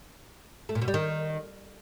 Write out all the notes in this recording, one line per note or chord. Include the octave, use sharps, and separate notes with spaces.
A3
A#2
B2
G3
D#3